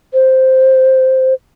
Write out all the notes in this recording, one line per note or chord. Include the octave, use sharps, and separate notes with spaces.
C5